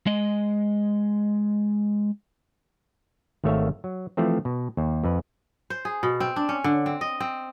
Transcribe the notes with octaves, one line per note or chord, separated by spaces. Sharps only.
G#3 D#5
G#1 D#3 A3 C#5 E5 F5
F#3
E3 F3 A3 C4
B2
D#2
F2 B4
C5
G#4
B2
C4
D4
C#4
D3
C4
D#5
C4